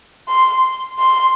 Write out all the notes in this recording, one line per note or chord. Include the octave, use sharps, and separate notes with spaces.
C6
C6